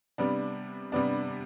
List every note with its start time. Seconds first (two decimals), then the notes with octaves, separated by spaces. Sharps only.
0.18 C3 G3 B3 D4
0.92 C3 G3 B3 D4